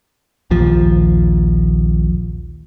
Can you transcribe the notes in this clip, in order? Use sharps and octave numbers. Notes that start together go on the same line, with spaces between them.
A#1 D#2 F3